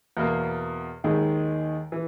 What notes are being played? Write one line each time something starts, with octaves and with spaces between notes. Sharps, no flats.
E2 B2 A#3
D#2 D#3 G#3
E3